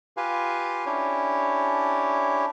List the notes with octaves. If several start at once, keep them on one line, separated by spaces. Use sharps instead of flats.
F4 G4 B4 F5 G#5
C#4 D4 E4 G4 C#5